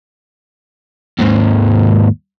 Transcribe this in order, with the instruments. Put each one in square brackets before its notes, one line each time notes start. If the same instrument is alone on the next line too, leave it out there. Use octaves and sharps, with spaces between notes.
[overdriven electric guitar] D#2 G#2